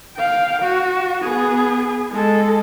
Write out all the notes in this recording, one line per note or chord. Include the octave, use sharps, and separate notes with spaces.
F5 G5
F#4
B3 G#4
G#3 A4